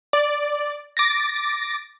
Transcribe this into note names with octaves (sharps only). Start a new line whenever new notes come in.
D5
D6 A6 A#6